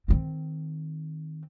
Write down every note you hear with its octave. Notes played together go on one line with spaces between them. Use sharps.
D#3 C4